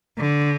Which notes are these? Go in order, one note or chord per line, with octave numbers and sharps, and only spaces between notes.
D3